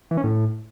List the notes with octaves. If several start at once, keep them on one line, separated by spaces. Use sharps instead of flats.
E3
C#4
A2